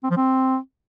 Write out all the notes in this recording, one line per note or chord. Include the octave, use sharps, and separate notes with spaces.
C4
F3
C4